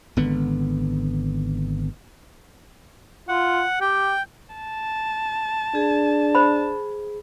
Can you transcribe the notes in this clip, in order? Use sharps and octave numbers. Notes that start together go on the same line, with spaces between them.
G#1 D3 B3
F4 F#5
G4 G5
A5
D4 G#4
C5 B5